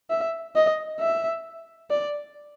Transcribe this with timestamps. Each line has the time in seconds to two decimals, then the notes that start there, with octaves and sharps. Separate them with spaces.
0.10 E5
0.55 D#5
1.00 E5
1.90 D5